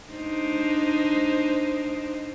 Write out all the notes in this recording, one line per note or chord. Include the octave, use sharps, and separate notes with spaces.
D4 D#4 C5